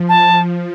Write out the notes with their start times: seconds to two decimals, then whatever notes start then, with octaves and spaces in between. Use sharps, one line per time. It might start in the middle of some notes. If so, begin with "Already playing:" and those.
Already playing: F3
0.09 A5